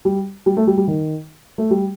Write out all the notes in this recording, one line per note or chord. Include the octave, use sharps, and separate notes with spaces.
G3
G3
A3
G3
G3
D#3
A3
G3